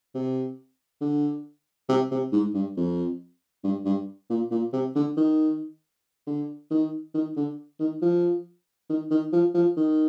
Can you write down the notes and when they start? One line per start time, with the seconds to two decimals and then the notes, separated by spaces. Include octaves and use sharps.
0.15 C3
1.01 D3
1.89 C3
2.11 C3
2.32 G#2
2.54 G2
2.77 F2
3.64 G2
3.85 G2
4.30 A#2
4.51 A#2
4.73 C3
4.95 D3
5.17 D#3
6.27 D3
6.71 D#3
7.14 D#3
7.36 D3
7.80 D#3
8.02 F3
8.90 D#3
9.11 D#3
9.33 F3
9.55 F3
9.77 D#3